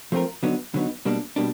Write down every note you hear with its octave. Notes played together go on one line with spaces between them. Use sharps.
F3 A3 C4 F4 A#4
D3 F#3 B3 D#4
D3 F#3 B3 D#4
B2 G3 A#3 D4
B2 G3 A#3 D4